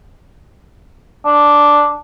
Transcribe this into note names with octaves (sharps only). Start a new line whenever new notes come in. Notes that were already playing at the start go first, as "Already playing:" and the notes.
D4